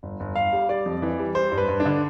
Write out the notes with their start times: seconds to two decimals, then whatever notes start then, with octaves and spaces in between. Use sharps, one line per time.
0.03 G1
0.20 G1
0.36 G1 F5
0.53 G3
0.69 G3 D5
0.86 F2
1.02 E3
1.19 G3
1.35 G3 C5
1.52 G2
1.58 B4
1.69 G2
1.80 D4
1.85 D3